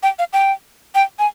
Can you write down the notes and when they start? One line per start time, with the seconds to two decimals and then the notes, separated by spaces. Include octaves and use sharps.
0.03 G5
0.19 F5
0.33 G5
0.95 G5
1.19 G#5